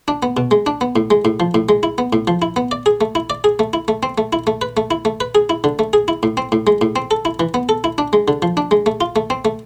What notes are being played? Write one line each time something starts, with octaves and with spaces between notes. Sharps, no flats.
D4
B3
B2
G#3
D4
B3
A2
G#3
A2
F3
A2
G#3
E4
B3
A2
F3
E4
B3
D5
G#4
A3
E4
D5
G#4
A3
E4
A3
C4
A3
E4
A3
B4
A3
E4
A3
B4
G#4
E4
D3
A3
G#4
E4
A2
C4
A2
G#3
A2
C4
A4
E4
E3
B3
A4
E4
D4
G#3
D3
F3
D4
G#3
A3
F4
A3
C4
A3